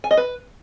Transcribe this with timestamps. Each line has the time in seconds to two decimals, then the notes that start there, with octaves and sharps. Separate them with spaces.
0.04 G#5
0.11 D#5
0.17 B4